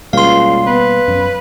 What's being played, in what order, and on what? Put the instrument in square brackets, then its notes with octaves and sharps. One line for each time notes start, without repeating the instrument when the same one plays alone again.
[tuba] C#2 [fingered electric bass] B2 G3 A#3 [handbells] F5 C6
[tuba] B3 [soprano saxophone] B4
[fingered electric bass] F#2 F#3